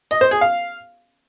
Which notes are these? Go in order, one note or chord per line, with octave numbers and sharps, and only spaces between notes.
D#5
C5
G#4
F5